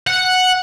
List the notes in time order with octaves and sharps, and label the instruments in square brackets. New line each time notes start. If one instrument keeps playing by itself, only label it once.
[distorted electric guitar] F#5